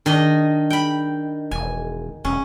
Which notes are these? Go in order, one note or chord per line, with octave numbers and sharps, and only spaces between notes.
D#3 D4 D#5
G5 B5
E1 G#5
E1 C#4